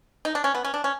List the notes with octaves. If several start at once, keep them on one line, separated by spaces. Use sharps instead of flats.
D#4
D4
C#4
B3
C#4
D4
C#4